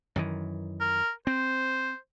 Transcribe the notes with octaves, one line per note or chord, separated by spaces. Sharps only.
F#2 D#3 E3
A#4
C4 C5